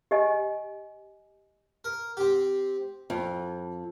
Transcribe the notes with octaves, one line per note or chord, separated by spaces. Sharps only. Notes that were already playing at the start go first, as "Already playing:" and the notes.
G4 D#5 G#5
A#4
C4 G4
F2